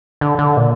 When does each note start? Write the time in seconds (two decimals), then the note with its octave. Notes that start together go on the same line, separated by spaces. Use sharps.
0.21 D3
0.39 D3
0.57 A#2